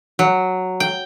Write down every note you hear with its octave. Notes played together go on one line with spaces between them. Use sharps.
F#3
G5